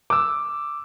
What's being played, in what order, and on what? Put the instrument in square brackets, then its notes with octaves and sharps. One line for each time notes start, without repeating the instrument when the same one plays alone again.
[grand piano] D6 E6